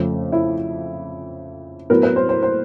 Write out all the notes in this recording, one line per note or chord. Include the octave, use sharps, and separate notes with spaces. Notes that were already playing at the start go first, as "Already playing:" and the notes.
Already playing: F2 C#3 F3 A3
E4
A2 F#3 B3 A#4
B4
C5
C5
C5